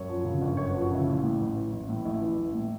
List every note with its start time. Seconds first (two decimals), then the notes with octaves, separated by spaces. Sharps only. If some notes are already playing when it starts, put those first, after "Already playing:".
Already playing: F#2 C#5
0.09 F3
0.25 C#3
0.42 G1
0.57 F#2 C#5
0.70 B4
0.74 F3
0.82 F#4
0.91 C#3 E4
1.07 A1
1.23 A2
1.40 A1
1.56 E3
1.72 A1
1.89 A2
2.05 A1 E4
2.21 E3
2.38 A1
2.54 A2